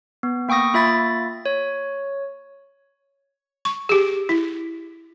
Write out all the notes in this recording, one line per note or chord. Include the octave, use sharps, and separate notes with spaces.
B3
A#3 G5 C#6 D#6 A#6
A#3 F4 E5 B5 A6
C#5
C#6
G4 G#4
E4